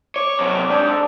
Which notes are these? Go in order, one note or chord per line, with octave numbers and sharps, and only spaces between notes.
C#5 D6
C3 F#3
G#2 D4 G4
A4